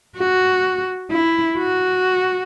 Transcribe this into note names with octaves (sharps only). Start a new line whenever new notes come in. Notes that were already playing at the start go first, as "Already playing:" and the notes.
F#4
E4
F#4